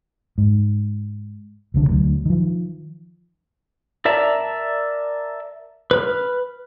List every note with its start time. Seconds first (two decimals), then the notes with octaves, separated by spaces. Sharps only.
0.38 G#2
1.74 E1 C2 D3
1.89 D2 F#3
2.25 D#3 F3
4.05 A#4 D5 E5 A5 A#5
5.91 B4 B5 F6